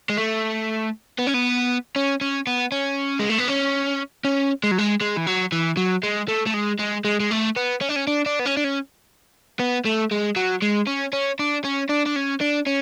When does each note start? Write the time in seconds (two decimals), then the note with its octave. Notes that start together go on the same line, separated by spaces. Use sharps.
0.09 G#3
0.17 A3
1.19 B3
1.27 C#4
1.34 B3
1.96 C#4
2.21 C#4
2.47 B3
2.72 C#4
3.19 G#3
3.30 A3
3.38 B3
3.48 C#4
4.25 C#4
4.64 G#3
4.71 F#3
4.79 G#3
5.01 G#3
5.17 E3
5.27 F#3
5.52 E3
5.77 F#3
6.03 G#3
6.28 A3
6.46 A3
6.54 G#3
6.79 G#3
7.05 G#3
7.20 G#3
7.31 A3
7.57 B3
7.81 C#4
7.89 D4
7.96 C#4
8.07 D4
8.26 D4
8.39 B3
8.45 C#4
8.57 D4
8.64 C#4
9.60 B3
9.85 A3
10.11 G#3
10.36 F#3
10.62 G#3
10.87 C#4
11.13 C#4
11.39 D4
11.64 C#4
11.89 D4
12.06 D4
12.16 C#4
12.41 D4
12.66 C#4